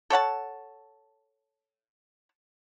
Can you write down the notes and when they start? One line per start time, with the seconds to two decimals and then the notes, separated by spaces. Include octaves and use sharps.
0.10 A4 C#5 F#5 A5